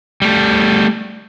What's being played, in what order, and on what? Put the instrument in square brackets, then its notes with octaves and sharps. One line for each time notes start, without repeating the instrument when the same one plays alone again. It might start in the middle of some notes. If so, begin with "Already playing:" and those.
[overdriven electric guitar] G3 A3